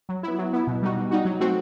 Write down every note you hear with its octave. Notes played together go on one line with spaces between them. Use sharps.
F#3
B3 E4
F#3
B3 E4
B2
G3 D#4 F#4
B2
G3 D#4 F#4
F#3
A3 C4 F#4